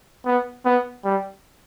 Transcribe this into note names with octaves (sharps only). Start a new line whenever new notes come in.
B3
B3
G3